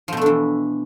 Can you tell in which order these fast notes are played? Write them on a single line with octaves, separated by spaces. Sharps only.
F3 B2 A3 D4 E3